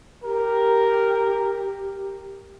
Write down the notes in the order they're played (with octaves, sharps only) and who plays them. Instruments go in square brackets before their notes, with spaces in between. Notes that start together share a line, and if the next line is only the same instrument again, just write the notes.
[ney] G4 [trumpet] A#4